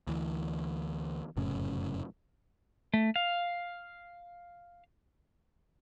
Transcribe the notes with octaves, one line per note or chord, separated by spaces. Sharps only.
D2 E3
F1 F#2 A2 C#3
A3
F5